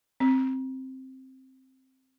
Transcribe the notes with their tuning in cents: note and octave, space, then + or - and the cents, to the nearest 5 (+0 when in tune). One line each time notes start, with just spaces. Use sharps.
C4 +5